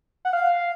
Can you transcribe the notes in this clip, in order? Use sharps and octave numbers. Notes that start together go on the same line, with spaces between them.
F#5
F5